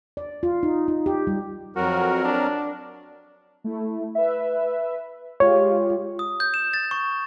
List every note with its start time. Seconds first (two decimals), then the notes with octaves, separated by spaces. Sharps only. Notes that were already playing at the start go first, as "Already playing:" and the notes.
0.17 D5
0.43 F4
0.63 D#4
0.88 D#4
1.06 G4
1.27 G3
1.76 F2 F#3 F#4 A#4
2.25 D4
3.64 A3 E4
4.15 B4 E5
5.40 G#3 F4 G4 C#5
6.19 D#6
6.40 G6
6.54 E7
6.74 A6
6.91 C#6